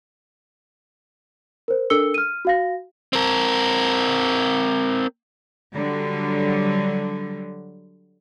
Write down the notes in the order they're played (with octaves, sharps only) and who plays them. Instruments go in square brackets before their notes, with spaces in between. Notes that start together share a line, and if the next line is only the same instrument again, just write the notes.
[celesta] A#4 C5
D4 A4 A#4 E6 C#7 G7
F6 D#7
F#4 F5 A#6
[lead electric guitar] C4 A#4
[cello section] D3 F#3 G3